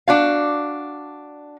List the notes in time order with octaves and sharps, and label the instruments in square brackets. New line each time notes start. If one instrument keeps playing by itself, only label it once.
[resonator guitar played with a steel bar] D4 F#4 F5